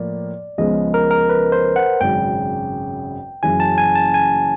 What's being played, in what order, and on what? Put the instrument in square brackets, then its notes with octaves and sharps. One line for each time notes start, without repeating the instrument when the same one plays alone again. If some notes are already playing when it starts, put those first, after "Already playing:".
Already playing: [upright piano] A2 F3 A#3 [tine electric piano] D5
[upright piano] C#2 C#3 F3 G#3 B3 [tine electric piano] D#5
[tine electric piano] A#4
A#4
B4
C5
F#5
[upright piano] G#1 F#2 C#3 [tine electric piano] G5
[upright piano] F#1 F#2 C#3 E3 [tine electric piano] G#5
[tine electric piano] A5
G#5
A5
G#5